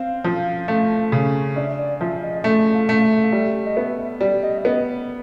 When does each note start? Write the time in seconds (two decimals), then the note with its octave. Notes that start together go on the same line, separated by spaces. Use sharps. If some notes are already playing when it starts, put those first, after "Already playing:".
Already playing: C4 F5
0.24 F3
0.68 A3
1.12 C#3
1.56 D4 E5
1.79 D5
2.01 F3 E5
2.23 D#5
2.44 A3 E5
2.74 F5
2.89 A3
2.96 F5
3.03 E5
3.24 F5
3.32 G3 E5
3.66 D#5
3.77 B3 E5
4.21 G3 D5
4.43 D#5
4.58 E5
4.65 B3 D#5